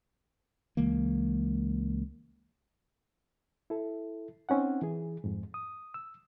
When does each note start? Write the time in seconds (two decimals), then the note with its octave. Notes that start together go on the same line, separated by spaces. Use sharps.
0.77 C#2 E3 G#3 A#3
3.70 E4 A4
4.49 C4 C#4 D#4 F#5
4.82 E3 G#4
5.24 F2 G#2
5.54 D#6
5.94 E6